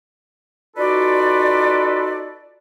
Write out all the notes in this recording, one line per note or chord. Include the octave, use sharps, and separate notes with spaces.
D#4 F4 F#4 A4 B4 D5